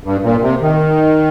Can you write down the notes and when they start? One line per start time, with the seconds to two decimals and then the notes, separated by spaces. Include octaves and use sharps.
0.04 G2
0.23 A#2
0.42 C3
0.61 D#3